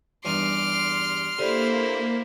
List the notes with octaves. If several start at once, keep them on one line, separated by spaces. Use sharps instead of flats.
E2 G2 D#4 C6 D6 F6
D3 A#3 E4 G4 C5